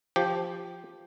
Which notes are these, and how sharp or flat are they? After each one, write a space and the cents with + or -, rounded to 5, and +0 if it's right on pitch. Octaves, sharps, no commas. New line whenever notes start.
F3 +0 G4 +0